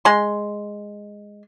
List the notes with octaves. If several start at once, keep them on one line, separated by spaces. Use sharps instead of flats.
G#3 C6